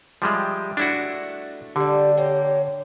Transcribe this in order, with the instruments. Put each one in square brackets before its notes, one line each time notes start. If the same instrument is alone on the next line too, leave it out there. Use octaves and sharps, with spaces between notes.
[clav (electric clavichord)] F3 G3 G#3 [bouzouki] G4 E5
[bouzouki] A2 [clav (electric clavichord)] D4 E4 F#4
[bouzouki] A3
[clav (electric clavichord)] D3 [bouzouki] F3 G3 [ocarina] G4
[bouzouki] A#3 G4 [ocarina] C#5